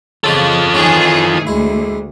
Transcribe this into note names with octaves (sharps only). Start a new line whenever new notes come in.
C#3 F3 F4 A4 D#5
D#3 E3 C#4 G#4 F5
D2 G#3 E4